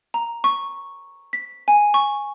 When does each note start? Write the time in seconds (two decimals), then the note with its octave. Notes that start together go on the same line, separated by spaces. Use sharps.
0.14 A#5
0.44 C#6
1.33 B6
1.68 G#5
1.94 C#6